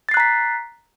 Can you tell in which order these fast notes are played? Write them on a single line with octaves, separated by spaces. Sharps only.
A6 C7 F#6 A#5 B6